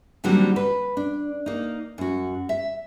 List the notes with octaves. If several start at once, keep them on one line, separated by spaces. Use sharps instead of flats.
D3 D#3 F#3 G3 A#3 C4
B4
D4
A#3 D#4
F#2 F#4
E5